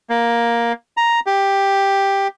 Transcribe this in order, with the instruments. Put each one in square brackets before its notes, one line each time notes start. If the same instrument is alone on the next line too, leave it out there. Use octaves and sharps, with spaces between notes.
[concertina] A#3
A#5
G4